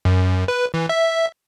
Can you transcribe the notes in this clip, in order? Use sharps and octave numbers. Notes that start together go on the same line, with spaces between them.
F#2
B4
E3
E5